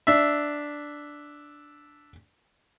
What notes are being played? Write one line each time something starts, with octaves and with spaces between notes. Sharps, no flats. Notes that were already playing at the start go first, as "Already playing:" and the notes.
D4 E5